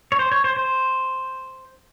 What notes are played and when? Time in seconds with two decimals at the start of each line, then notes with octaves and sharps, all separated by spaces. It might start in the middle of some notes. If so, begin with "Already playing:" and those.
0.12 C#5
0.19 C5
0.32 C#5
0.44 C5
0.57 C5